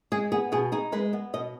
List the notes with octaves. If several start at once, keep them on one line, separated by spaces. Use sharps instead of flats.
G#3 G#4
B3 G#4
B2 G#4
D#4 G#4
G#3 B4
B3
B2 D#5